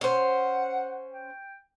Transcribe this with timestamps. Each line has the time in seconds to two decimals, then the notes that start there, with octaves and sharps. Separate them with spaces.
0.01 C#4 C5 F#5
1.12 G5